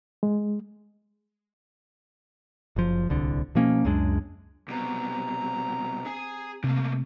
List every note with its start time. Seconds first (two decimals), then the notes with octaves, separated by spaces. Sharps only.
0.23 G#3
2.76 F#1 F3
3.09 D1 C2 D3
3.55 B2 F3 A#3 C#4
3.85 C#2 F#2 G#3 D4
4.68 C2 B2 C4 A#5
6.06 G#4 G#5
6.64 C3 A3 A#3